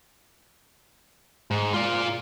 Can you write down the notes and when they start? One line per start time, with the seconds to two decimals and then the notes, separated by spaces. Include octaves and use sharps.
1.51 G#2
1.74 F4 D5